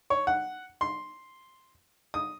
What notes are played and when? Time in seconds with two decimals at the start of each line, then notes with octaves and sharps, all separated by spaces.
0.10 C#5
0.27 F#5
0.81 C6
2.14 D#6